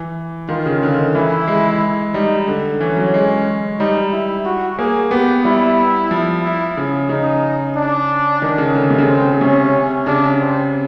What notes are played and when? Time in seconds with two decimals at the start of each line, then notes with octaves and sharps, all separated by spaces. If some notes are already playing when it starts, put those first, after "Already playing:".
Already playing: E3
0.49 D#3 F4
0.66 C#3
0.83 D3
0.99 D#3
1.15 E3 E4
1.48 G#3
2.14 G3 D#4
2.48 D3
2.80 E3 C#4
2.96 F#3
3.14 G#3
3.79 G3 D#4
4.13 E4
4.45 F#4
4.78 A#3 G#4
5.11 B3 G4
5.45 G3 E4
6.11 F3
6.43 E4
6.77 C#3
7.09 C#3 D#4
7.76 D4
8.42 D#3
8.58 C#3
8.75 D3
8.83 C#3
8.90 C3
8.98 C#3
9.08 C4
9.32 C#3
9.41 C3 C#4
10.07 C#3 D4
10.40 C4